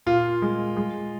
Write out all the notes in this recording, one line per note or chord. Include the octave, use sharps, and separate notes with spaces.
A#2 F4
G#3
G#3